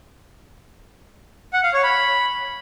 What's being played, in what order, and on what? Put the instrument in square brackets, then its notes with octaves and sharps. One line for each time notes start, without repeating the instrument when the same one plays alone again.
[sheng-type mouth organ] F#5
F5
C#5
B5